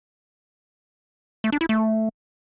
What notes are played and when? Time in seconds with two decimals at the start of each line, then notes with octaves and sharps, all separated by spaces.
1.44 A3
1.52 D4
1.61 E4
1.69 A3